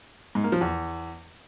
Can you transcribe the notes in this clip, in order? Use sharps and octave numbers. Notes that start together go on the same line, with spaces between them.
G#2
A#3
F3
E2